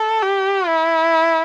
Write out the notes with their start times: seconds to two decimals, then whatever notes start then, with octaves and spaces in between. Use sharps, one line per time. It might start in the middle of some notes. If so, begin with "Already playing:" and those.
Already playing: A4
0.23 G4
0.68 E4